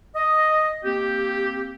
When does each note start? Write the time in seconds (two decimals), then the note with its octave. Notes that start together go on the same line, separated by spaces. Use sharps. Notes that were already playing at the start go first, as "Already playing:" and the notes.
0.15 D#5
0.84 A#3 C4 G4